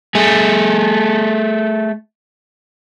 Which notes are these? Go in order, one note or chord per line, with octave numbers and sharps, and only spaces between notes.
A3 G#4